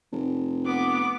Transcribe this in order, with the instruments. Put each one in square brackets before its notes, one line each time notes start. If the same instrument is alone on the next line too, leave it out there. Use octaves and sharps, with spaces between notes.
[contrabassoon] F1
[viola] B3 D6